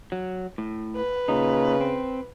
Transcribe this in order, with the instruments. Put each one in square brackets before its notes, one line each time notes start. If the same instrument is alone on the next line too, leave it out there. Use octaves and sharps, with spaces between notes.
[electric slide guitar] F#3
A2
[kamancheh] B4
[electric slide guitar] A#2 D#4 [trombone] C#3
[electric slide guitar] C4